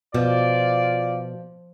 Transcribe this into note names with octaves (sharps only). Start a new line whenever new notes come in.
B2 F3 F4 D5